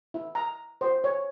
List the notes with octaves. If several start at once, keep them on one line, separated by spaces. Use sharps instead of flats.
E4
A#5
C5
C#5